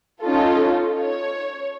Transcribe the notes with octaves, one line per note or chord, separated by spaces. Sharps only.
C#4 D#4 F4 A4
C#5